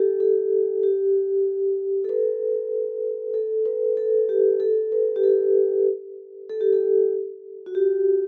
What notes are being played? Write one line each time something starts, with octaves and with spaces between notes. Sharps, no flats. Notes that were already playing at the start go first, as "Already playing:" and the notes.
Already playing: G4 A4
A4
G4
A4
B4
A4
B4
A4
G4
A4
B4
G4
A4
A4
G4
A4
F#4
G4